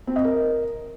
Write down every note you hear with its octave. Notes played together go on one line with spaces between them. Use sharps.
C4
D#5
A#4